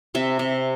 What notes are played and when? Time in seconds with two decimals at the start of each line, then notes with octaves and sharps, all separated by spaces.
0.15 C3 E5
0.39 C3